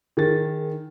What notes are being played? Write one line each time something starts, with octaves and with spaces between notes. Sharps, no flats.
D#3 G#4 A#4 A6